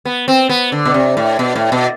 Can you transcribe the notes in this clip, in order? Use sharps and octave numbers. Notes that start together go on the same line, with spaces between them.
B3
C4
B3
D3
B2
C3
A2
B2
A2
B2